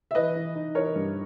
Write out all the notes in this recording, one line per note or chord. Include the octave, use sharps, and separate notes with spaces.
E5
E3 B4 D#5
E3
D#4
E3 A#4 C#5
G2